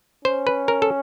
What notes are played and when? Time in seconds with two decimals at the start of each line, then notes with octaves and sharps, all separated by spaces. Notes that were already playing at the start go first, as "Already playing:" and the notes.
0.25 C#4 C5
0.47 B4
0.68 A#4
0.82 A4